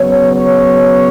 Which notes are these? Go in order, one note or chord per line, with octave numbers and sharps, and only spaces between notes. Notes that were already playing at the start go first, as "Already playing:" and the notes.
Already playing: C#3 F#3 B3 C#5
C#5